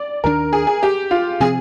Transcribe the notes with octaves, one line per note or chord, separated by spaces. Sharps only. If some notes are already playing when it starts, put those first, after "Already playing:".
Already playing: D5
D#2 D#3 G#3 D4 A#4
G#4
G#4
G4
F4
C3 F3 C4 G#4